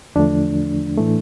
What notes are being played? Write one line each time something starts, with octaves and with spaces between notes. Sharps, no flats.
E2 D3 F3 A3 D4
A2 E3 A3